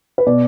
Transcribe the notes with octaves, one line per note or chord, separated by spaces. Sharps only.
B4
B2 D5